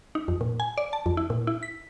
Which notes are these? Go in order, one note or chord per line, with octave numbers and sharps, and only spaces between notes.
D#4
F2
A#2
G#5
D5
A5
F2
E4
A#2
E4
B6